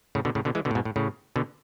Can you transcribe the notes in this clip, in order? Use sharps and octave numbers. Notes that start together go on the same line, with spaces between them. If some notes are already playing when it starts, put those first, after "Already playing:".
A2 C#3
B2 D3
A2 C#3
B2 D3
E3 G#3
B2 D3
A2
G#2 B2
A2
A2 C#3
B2 D3